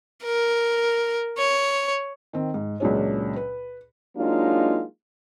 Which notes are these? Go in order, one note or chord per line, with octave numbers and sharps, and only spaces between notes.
A#4
C#5
D#3 C4
G#2
C#2 A#2 F#3 D4 G#4 C#5
B4
F#3 G#3 A#3 D4 D#4 F4